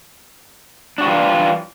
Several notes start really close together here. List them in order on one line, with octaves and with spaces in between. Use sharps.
D4 F#4 G3 E3 F4